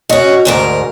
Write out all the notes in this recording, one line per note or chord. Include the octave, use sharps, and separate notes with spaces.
C#4 F#4 D#5
D2 G#2 A#4